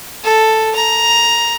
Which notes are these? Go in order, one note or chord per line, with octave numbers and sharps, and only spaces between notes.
A4
A#5